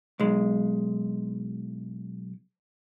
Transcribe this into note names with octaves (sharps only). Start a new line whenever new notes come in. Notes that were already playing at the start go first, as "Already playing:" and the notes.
B1 G#3